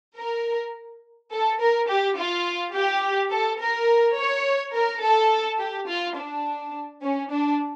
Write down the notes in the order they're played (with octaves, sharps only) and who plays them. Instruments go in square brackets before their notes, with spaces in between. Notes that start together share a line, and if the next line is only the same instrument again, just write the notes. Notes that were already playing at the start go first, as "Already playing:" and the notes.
[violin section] A#4
A4
A#4
G4
F4
G4
A4
A#4
C#5
A#4
A4
G4
F4
D4
C#4
D4